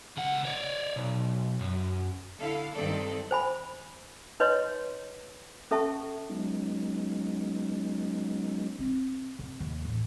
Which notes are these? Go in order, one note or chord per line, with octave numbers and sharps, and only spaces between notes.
C#2 F#5
C#5 D5
B1
F#2
D3 E4 A4 F5
G2 D#3 C4 A4 D5
C5 G#5 B5
D#4 B4 C#5 D#5 C6
C#4 A4 E5 A5 C#6
F#3 G#3 B3 C#4 D#4
C4 D4
C3
D#2
A1